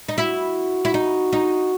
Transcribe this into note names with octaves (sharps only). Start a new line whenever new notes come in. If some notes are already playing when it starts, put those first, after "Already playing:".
D#4
E4 F#4
E4
D#4
D#4